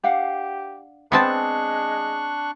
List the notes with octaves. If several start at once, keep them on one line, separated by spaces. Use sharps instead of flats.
D4 G4 F5 F#5
G#3 B3 C4 D4 G#5 A5 C#6 F#6